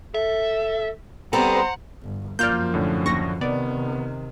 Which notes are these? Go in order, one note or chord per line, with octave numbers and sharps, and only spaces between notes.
A4 E5
G3 B3 C4 A4 C5 F#5 A#5
G1
F#2 F3 A#3 F4 D5 F6 G6
A2 D3 C#4
D#2 C#6 A#6
C3 D#3 B3 D5